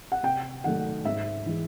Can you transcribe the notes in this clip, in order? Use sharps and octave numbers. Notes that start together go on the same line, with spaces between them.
F#5
C3 G5
D#3 F#3 A3 F#5
G#2 E5
E3 G#3